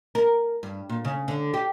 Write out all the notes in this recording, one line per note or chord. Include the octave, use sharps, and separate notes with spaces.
A#4
G2
A#2
C#3
D3
G4